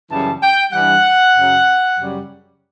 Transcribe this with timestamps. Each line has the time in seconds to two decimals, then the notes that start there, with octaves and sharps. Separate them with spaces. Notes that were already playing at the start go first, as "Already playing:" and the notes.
0.10 F#2 C#3 E3 G3 A5
0.42 G5
0.72 G2 E3 G3 F#5
1.35 F#2 C#3 F#3
1.98 F#2 C#3 G3